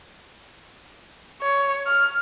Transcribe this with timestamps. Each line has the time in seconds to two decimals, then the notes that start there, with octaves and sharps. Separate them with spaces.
1.42 C#5
1.87 F6